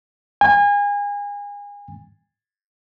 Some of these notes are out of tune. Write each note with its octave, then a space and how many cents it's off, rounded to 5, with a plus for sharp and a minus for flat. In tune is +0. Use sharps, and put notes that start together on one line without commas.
G#5 -30